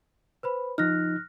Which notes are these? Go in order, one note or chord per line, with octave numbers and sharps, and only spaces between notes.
B4 C5 B5
F3 D#4 F6 F#6 A#6